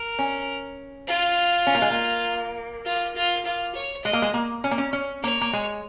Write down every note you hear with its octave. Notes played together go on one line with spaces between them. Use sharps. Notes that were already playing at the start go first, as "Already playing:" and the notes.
Already playing: A#4
C#4
F4
C#4
A#3
G#3
A#3
F4
F4
F4
C#5
G#3 D#5
A#3
G#3
A#3
C#4
A#3
C#4
C#4
A#3 C#5
A#3
G#3